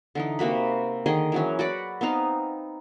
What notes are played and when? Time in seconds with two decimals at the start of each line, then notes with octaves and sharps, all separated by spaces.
0.15 D3 E3 D#4
0.39 C3 A#3 F#4 B5
1.06 D3 D#3 G#4 D#5
1.32 E3 F#3 C#4
1.59 F#4 D5 F#5 B5
2.01 B3 C4 D#4 F5